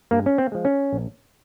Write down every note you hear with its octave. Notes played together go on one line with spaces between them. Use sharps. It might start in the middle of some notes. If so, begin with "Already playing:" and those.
G2 A#3
C#4
C4
F3 G#3
C#4
A#1